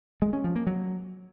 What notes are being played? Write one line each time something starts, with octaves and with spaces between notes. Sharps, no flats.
G#3
C#4
F3
A#3
F#3